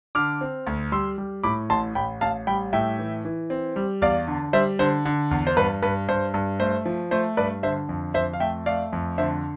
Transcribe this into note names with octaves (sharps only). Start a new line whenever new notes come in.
D3 D6 F6
C4
D2
G3 C6 E6
G3
A2 B5 D6
A1 A5 C6
A1 G5 B5
A1 F5 A5
G3 G5 B5
A2 E5 G5
E3
E3
C4
G3
E2 D5 F5
D3
G3 C5 E5
D3 C5
D3
E2
C5
G2 B4
G2 B4
G2 C5
G2
A3 C5
F3
A3 C5
G2 B4 D5
D3 C5 E5
F2
F2 C5 E5
F5
A3 E5 G5
A3 D5 F5
F2
D3 C5 E5